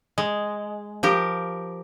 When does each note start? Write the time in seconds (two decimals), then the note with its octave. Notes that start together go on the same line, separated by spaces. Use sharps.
0.18 G#3
1.03 F3 G4 A#4